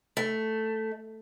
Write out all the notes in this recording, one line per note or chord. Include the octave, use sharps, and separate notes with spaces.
A3